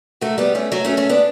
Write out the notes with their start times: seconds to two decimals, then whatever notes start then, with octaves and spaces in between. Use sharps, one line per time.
0.21 F#3 A3
0.38 G3 B3
0.55 A3 C#4
0.72 F#3 A3
0.85 A3 C#4
0.97 A3 C#4
1.09 B3 D4